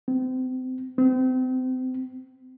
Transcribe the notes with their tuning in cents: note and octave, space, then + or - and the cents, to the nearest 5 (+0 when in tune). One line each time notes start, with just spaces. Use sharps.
C4 -30
C4 -30